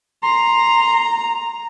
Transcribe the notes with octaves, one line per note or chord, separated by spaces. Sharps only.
A#5 C6